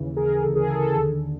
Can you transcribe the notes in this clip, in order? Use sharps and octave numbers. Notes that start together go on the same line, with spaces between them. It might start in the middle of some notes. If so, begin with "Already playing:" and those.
Already playing: D#2 C#3 E3
G#4 A#4
A#4
D2 C#3 E3 A4
G#4 A#4
A4
A4
D#2 D3